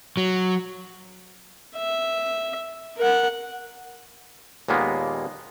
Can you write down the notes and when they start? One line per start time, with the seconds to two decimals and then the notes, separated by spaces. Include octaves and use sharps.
0.17 F#3
1.76 E5
2.97 A#4 F#5
4.68 D#2 A#2 G#3 A#3 B3